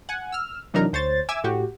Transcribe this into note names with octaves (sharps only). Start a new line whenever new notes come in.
F#5 G#5
E6 F6
C3 E3 F#3 D4 D#4 A#4
D2 C5 C#5 A6
E5 G#5 D6 E6
A2 F#4 G4